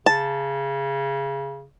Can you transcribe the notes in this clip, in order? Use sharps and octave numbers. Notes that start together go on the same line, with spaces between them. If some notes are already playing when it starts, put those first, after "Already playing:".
C#3 A5